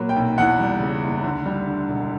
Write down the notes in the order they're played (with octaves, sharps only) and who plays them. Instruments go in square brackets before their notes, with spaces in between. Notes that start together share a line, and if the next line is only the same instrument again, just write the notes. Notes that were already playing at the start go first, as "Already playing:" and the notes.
Already playing: [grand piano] A#2 F#3 A#3 B5
G5
B1
E2 F#5
G3
C#3
F#1
D2
G3
D3
E1